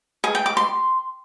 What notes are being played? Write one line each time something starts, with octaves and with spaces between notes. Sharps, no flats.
G#4
G5
D6
C6